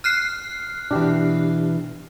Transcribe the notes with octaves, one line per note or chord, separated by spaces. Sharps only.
F6 F#6 C7
B2 E3 D4 G4